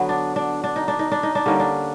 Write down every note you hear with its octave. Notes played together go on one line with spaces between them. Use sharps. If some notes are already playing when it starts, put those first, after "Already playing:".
Already playing: D3 F#3 B3
D4
D4
D4
D#4
D4
D#4
D4
D#4
D4
D3 G3 A#3 C#4 D#4
D4